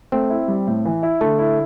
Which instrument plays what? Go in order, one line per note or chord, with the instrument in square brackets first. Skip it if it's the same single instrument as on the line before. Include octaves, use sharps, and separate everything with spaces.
[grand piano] A3 [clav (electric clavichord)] C4
[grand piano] E4
G3
A2
E3
E4
[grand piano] D3 [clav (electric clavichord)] A3
[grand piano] E4